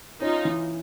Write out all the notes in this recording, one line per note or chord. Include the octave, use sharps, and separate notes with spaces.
C#4 D#4 F4
E3